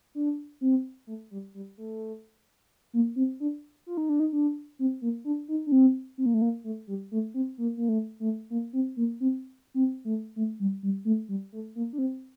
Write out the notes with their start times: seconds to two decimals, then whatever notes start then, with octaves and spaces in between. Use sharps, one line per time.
0.15 D4
0.61 C4
1.07 A3
1.31 G3
1.54 G3
1.78 A3
2.93 A#3
3.16 C4
3.40 D4
3.86 F4
3.97 D#4
4.09 D4
4.20 D#4
4.33 D4
4.79 C4
5.02 A#3
5.25 D4
5.48 D#4
5.67 D4
5.72 C4
6.18 C4
6.26 A#3
6.34 A3
6.42 A#3
6.64 A3
6.87 G3
7.11 A3
7.34 C4
7.58 A#3
7.77 A#3
7.89 A3
8.20 A3
8.50 A#3
8.73 C4
8.97 A#3
9.20 C4
9.74 C4
10.05 A3
10.36 A3
10.60 G3
10.83 G3
11.05 A3
11.29 G3
11.53 A3
11.75 A#3
11.93 D4
11.98 C4